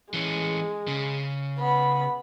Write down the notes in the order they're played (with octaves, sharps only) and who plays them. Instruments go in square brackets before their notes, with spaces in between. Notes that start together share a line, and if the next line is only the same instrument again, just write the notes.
[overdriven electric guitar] E3 C#4 [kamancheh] G#3
[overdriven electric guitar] C#3
[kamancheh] B3 B5